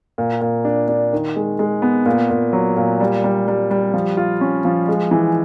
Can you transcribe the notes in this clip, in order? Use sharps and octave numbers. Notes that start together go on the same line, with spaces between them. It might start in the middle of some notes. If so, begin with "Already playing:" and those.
A#2
A#2
D4
D4
D#3
G#3
G#3
B3
A#2
A#2
F#3
A#2
G3
G3
G3
G3
F3
F4
C#4
F3
G#3
E3